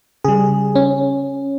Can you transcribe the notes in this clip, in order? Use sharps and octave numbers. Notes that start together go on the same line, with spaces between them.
C#3 G3 G#4
C#4